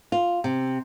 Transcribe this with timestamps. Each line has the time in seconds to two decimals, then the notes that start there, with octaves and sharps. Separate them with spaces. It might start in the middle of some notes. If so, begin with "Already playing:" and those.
0.12 F4
0.44 C3